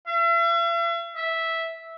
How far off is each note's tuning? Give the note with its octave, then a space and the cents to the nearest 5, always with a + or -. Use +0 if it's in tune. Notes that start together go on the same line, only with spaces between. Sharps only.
E5 +45
E5 -10